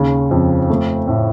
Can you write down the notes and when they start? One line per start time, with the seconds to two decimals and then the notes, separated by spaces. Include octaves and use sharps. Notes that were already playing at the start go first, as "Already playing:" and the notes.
Already playing: D#2 C#3
0.31 F2
0.69 A3
1.07 A2